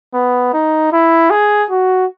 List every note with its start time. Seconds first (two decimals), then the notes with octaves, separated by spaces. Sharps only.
0.14 B3
0.54 D#4
0.92 E4
1.30 G#4
1.70 F#4